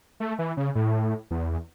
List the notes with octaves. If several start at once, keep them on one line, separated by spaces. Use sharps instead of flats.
A3
E3
C#3
A2
E2